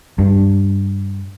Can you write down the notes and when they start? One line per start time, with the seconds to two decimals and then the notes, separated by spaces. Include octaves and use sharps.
0.19 G2